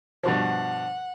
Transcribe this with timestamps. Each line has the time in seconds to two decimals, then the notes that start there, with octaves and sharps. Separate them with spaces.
0.23 G2 B2 F3 F#5